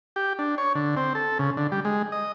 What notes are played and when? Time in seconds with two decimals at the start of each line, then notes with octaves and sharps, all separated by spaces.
0.16 G4
0.39 D4
0.58 C#5
0.75 D3
0.97 C4
1.15 A4
1.39 C#3
1.57 D3
1.72 G3
1.85 G#3
2.12 D#5